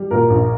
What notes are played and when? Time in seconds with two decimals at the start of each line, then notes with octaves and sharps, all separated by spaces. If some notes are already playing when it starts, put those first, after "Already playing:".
Already playing: G3
0.11 A#2 A#4
0.30 A#1